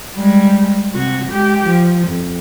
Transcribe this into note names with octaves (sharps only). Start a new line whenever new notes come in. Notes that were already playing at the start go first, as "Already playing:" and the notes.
G3 G#3
C3 F#4
G#3 G4
F3
F2